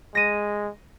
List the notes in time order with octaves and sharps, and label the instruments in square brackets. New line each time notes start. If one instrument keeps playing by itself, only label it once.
[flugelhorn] G#3 [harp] A#6 D#7